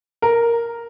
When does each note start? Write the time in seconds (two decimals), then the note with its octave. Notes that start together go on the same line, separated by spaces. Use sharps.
0.22 A#4